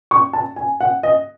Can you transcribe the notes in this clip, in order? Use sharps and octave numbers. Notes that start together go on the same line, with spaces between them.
C#6
A5
G#5
F#5
D#5